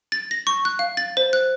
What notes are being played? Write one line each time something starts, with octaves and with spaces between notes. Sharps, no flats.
A6
A#6
C#6
F#6
F5
A6
C5
F#6